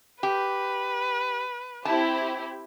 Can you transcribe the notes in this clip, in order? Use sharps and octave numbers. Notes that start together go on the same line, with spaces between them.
G4 B4
C4 E4 G4 A5